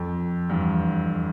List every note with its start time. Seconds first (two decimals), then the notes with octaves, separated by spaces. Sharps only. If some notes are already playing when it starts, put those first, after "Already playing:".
Already playing: F2
0.49 E2 G2